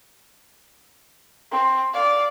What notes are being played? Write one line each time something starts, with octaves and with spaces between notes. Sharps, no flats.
C4
D5 F5